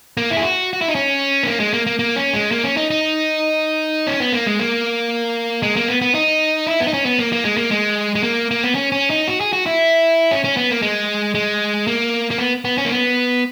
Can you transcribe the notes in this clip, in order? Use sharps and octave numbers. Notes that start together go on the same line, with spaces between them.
A#3
E4
G#4
F#4
F#4
E4
D#4
C#4
B3
A#3
G#3
A#3
A#3
A#3
C#4
G#3
A#3
C#4
D#4
D#4
C#4
B3
A#3
G#3
A#3
G#3
A#3
B3
B3
D#4
E4
B3
D#4
C#4
B3
A#3
A#3
G#3
A#3
G#3
G#3
A#3
A#3
B3
C#4
C#4
D#4
F#4
G#4
F#4
E4
C#4
C#4
B3
A#3
G#3
G#3
A#3
A#3
B3
B3
C#4
A#3
B3